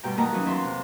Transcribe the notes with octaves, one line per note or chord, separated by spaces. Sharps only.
G2 B2 G5 A#5
D#3 A#3 D#5 F#5 A5 A#5
D#3 E3 F#3 C#4 D#4
E2 A#4 E5 C6
C3